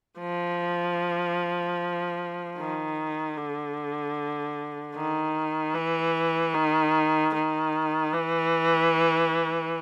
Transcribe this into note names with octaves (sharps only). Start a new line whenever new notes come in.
F3
D#3
D3
D#3
E3
D#3
D#3
E3